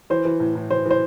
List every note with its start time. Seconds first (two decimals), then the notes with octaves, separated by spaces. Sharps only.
0.10 E3 C5
0.25 E3
0.40 A2
0.55 A2
0.71 E3 C5
0.85 E3
0.91 C5